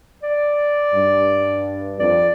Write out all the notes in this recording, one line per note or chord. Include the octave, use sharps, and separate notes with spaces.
D5
G2
F2 D5